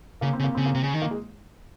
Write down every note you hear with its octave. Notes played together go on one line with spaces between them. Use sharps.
C#3 A#3
C4
C#3
A#3
C#3 C4
A#3
C3
C#3
D#3
A#3
G#3